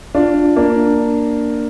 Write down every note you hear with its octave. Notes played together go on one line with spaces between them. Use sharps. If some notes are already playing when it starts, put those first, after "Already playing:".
D4 F4
A#3 D4